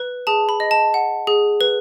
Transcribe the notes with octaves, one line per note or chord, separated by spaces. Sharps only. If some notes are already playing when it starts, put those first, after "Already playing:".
Already playing: B4
G#4 A5
B5
D#5
A5
F#5
G#4
B4